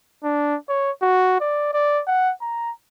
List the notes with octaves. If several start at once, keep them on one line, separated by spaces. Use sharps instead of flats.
D4
C#5
F#4
D5
D5
F#5
A#5